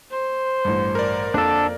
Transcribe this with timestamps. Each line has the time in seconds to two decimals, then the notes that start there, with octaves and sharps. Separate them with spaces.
0.11 C5
0.65 A1 G2
0.95 A#4 D5
1.34 F2 A#3 D4 A4